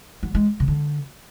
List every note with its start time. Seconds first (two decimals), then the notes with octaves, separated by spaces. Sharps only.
0.23 F#3
0.35 G#3
0.60 C#3
0.68 D3